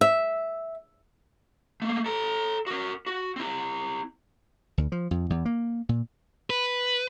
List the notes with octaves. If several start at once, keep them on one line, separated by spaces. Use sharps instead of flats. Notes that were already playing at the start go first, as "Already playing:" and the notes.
E5
A3 A#3
A4 A#5
F#4 A#4
F#4
C4 E4
D2
F3
F2
E2
A#3
A#2
B4